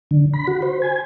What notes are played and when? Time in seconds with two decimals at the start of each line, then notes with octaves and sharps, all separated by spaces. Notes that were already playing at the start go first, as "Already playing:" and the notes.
0.11 D3
0.34 B5
0.47 F#4
0.62 C5
0.82 G#5